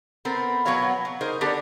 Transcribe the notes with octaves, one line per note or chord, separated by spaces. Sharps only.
B3 C4 A4 A#4
B2 F#3 B3 F#4 C#5 F5
F#3
D#4 G#4 A#4 C5 D#5
D3 B3 D4 G4 A4 A#4